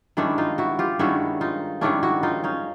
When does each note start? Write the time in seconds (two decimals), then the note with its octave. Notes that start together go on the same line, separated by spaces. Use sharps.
0.17 G2 D#3 G#3 C#4 D4 E4
0.38 D#4 F4
0.58 E4 F#4
0.79 F4 G4
0.99 G2 D#3 G#3 C#4 E4 F#4
1.41 D#4 F4
1.81 G2 D#3 G#3 C#4 D4 E4
2.03 E4 F#4
2.23 D#4 F4
2.44 C#4 D#4